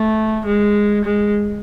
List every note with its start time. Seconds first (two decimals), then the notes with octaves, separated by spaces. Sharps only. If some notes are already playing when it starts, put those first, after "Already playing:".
Already playing: A3
0.46 G#3
1.04 G#3